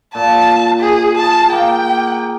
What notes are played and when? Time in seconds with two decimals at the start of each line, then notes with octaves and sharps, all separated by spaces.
0.15 A#2 A5
0.79 G#4
1.17 G#4 A5
1.52 A#3 G5